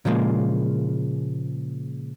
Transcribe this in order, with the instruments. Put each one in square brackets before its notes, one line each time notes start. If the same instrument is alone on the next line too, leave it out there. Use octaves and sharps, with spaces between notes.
[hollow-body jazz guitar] A#2 C#3 F3 G#3 A#3